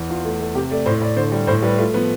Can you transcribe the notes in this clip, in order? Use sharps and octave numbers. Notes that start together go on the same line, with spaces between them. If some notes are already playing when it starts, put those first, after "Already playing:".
Already playing: E2
E2 F4
A3
A3
C3 G4
A3 D5
A2 C5
A2 D5
D3 C5
G3
A2 C5
G3 B4
A3 F4
F3 B3